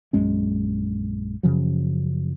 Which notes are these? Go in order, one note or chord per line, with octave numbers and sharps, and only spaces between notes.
A#1 F#2 G#3 C#4
F#2 C#3 F3 F#3